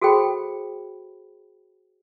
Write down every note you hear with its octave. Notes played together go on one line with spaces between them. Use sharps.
F#4 G#4 A4 C5 G5 B5